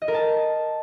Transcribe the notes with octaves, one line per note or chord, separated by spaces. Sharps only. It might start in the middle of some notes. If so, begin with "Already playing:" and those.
D#5
A#4
A5